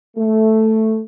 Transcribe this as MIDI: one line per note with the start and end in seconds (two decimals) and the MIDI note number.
0.17 1.00 57